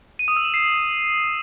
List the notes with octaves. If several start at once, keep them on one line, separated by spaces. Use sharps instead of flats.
D#7
D#6
E6
E7
C7